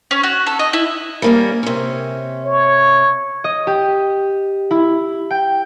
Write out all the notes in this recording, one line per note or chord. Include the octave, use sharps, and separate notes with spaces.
C#4
F#4
A4
D#5
E4
G3 A#3 C#4
C3 C#4
C#5
D#5
G4
E4
G5